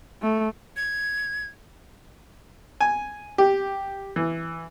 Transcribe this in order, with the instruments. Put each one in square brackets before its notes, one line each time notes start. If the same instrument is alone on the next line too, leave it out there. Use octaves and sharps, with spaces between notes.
[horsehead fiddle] A3
[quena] G#6
[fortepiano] G#5
G4
E3